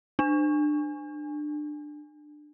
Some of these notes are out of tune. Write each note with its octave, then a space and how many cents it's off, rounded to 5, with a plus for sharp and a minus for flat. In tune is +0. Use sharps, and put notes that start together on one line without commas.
D4 +25